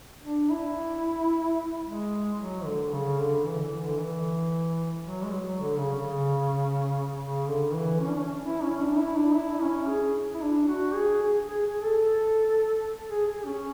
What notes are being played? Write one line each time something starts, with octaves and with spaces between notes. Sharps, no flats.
D4
E4
G#3
F#3
D3
C#3
D3
E3
E3
D3
E3
F#3
G#3
F#3
D3
C#3
C#3
C#3
D3
E3
C#4
D4
C#4
E4
C#4
D4
E4
D4
E4
C#4
G#4
E4
D4
F#4
G#4
G#4
G#4
G#4
A4
G#4
G#4
C#4